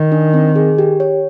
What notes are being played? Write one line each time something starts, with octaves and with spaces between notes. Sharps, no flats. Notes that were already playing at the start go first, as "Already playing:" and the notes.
Already playing: D#3
D4
C4
G#4
G4
C#5